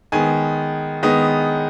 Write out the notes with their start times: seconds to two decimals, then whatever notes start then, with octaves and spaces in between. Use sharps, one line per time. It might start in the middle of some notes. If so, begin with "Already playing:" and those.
0.12 D#3 G#3 B3 G#5
1.03 D#3 G#3 B3 D#5